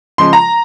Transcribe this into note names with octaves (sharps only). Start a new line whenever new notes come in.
C#3 F3 G#3 C6
A#5